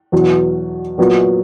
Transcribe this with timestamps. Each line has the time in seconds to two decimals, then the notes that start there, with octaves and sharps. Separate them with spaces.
0.12 E2 B2 F#3
0.98 A#2 F#3 B3